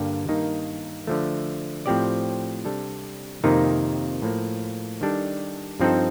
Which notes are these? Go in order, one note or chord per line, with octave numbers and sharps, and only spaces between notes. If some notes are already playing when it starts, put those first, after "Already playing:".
Already playing: G2 D3 G3 A#3
G2 D#3 A#3 D#4
D3 F3 A3
A2 F3 C4 G4 D5
C3 G3 D4 A4
F2 C3 D#3 A#3 D#4
A2 F3 A#3
D#3 G3 D4 A4
G2 F3 C4 D#4 A4